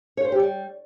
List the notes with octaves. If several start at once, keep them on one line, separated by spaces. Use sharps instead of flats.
C#5
C5
G4
G3